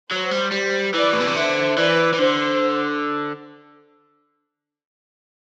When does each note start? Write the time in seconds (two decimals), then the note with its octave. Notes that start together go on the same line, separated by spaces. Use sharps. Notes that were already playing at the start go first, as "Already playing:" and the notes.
0.11 F#3 C5
0.31 G3
0.52 G3
0.94 E3 B4 D5
1.13 A2
1.20 B2
1.28 C3
1.36 D3 C5 E5
1.77 E3 B4 D5
2.14 E3
2.19 D3 C5